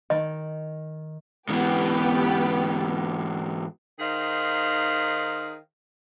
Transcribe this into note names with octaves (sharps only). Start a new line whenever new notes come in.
D#3 D#5
G#2 E3 B3 G4
D#3 D#4 G#4 C5 F5